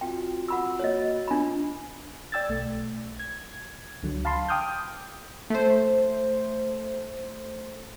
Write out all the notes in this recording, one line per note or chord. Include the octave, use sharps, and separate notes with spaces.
C4 F4 F#4 G5
F#5 B5 E6
A#3 F#4 C#5 D#5
D4 F4 B5
D5 G5 E6 G#6 A6
B1 A3
G#6
C#2 D3 F#3
F5 A5 B5 C6
G5 D6 D#6 F6 G6
A3 C5